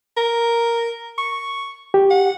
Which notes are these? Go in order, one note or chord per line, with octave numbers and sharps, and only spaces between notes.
A#4
C#6
G4
F#5